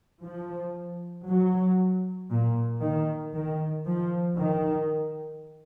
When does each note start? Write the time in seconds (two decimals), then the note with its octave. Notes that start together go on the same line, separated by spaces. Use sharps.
0.23 F3
1.26 F#3
2.30 A#2
2.81 D#3
3.34 D#3
3.86 F3
4.37 D#3